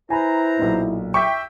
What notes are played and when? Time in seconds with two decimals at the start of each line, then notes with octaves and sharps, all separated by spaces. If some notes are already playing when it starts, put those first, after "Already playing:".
0.10 E4 B4 C5 G#5 A#5 B5
0.59 B1 A#2
1.14 E5 G5 C#6 D6 B6